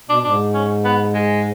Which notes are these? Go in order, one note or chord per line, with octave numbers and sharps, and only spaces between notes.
B2 D4
G#2 D4
C#4
B3
G#3